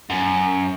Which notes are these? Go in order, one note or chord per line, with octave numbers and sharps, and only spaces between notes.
F#2